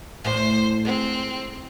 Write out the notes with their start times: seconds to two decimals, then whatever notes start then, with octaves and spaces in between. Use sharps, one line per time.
0.25 E2 A2 C5
0.85 G#3 C4